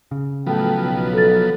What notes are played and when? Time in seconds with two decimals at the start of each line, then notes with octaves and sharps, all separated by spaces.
0.11 C#3
0.46 A2 F3 F#3 B3 A4 G5
0.83 B1
1.13 A4 A6